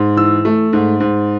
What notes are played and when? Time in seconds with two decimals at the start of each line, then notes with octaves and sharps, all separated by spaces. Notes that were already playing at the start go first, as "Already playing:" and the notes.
Already playing: G#2
0.17 E3 E6
0.45 A3
0.73 G#2
1.00 G#2